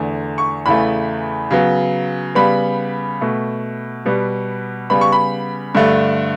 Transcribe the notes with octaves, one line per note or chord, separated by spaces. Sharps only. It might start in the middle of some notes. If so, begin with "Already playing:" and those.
Already playing: E2 D3 A3
C#6
E2 C#3 E3 A3 B5
C#3 F#3 B3
C#3 G3 B3 B5
B2 A3
B2 G3 B3
C#3 G3 B3 B5
C#6
B5
G2 D3 A3